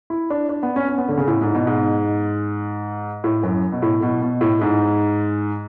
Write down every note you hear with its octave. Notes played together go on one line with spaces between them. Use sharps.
E4
D4
D4
B3
C#4
C#4
B3
D3
C#3
A2
G#2
B2
G#2
A2
F#2
B2
A2
B2
B2
A2
G#2